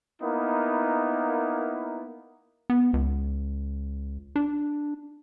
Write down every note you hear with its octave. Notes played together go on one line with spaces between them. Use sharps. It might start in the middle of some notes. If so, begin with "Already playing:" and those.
A#3 B3 D#4 E4 A#4
B3
C#2
D4